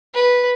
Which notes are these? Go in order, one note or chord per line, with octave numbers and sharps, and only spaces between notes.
B4